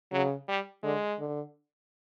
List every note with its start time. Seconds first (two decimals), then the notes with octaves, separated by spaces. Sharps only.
0.12 C#3 F#3
0.48 G3
0.83 D3 G#3
1.19 D3